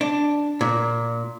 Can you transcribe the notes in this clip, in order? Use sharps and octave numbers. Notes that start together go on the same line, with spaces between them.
D4
A#2